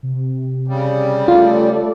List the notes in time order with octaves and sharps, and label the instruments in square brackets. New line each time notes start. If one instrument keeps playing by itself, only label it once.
[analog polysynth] C3
[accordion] C#3 G3
[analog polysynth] A3 A4 D5 [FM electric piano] F4